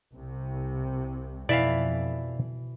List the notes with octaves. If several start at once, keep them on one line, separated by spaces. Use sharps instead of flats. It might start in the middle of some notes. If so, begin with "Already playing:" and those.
C2 C3
F2 B2 E3 D5 E5 F5